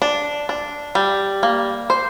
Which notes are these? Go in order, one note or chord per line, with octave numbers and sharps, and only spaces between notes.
D4
D4
G3
A#3
C5